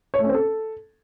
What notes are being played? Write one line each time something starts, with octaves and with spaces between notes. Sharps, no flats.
C#5
A3
C#4
C4
A4